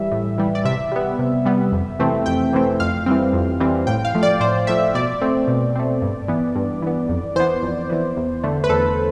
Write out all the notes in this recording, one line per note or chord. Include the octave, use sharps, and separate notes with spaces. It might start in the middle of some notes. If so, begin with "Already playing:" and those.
Already playing: E3 G3 E5
A2
E3 G3
D5
C3 E5
G3 B3
C3
G3 B3
F2
C3 E3 A3 C4
F2 G5
C3 E3 A3 C4
F2 F5
E3 G3 C4
F2
E3 G3 C4
A2 G5
F5
F3 A3
D5
A2 C5
F3 A3 E5
B2 D5
A3 C4
B2
A3 C4
G2
E3 B3
G2
E3 B3
F2
E3 B3 C5
F2
E3 B3
E2
D3 A3
B4
E2 A4